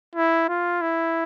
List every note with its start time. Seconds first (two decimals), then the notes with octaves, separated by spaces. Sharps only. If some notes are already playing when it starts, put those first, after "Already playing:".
0.15 E4
0.48 F4
0.81 E4